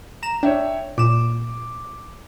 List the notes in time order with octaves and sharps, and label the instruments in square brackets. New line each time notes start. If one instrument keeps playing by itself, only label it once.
[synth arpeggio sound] A#5 E7
[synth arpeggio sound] D4 [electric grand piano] C#5 E5 G5
[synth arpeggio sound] A#2 E7 [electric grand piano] D6